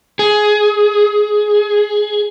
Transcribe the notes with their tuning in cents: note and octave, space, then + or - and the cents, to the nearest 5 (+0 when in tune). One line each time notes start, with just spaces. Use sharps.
G#4 +15